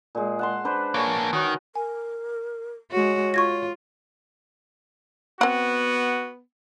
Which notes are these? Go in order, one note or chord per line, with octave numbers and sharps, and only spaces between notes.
A#2 G#3
F#5 A5 C6
D4 B4 C5
A#3 D4 C#5 G#5 C#6
D#3 F#4 C#5
A#4 G#5
G#3 F#4 C#5
F4 C#6 G#6 A#6
B3 C4 F#4 F#5